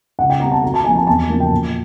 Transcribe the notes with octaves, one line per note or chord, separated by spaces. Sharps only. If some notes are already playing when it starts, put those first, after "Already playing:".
C#2 F#5
G5
B2 G3 C4 A#5
A5
D2 A#5
A5
C3 F3 A#3 G#5
A5
E2 A5
C#3 F3 A#3
G5
A#2